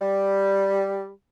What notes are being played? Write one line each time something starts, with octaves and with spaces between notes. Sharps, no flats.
G3